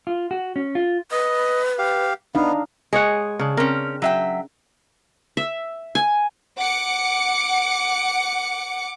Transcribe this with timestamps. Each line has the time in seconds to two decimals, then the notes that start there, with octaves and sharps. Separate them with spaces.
0.07 F4
0.31 F#4
0.56 C#4
0.75 F4
1.12 B4 D#5
1.78 G4 F5
2.35 B3 D4 D#4 F5
2.93 G#3 G#4 C#5 F#5
3.39 C#3 D4
3.57 C4 C#4 A#4
4.02 F#3 E5 G5
5.37 E5
5.95 G#5
6.59 F#5 D6 C#7